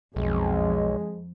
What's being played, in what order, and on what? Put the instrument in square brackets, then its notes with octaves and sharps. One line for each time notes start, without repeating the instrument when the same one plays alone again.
[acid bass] B1 [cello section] F2 [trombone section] G#3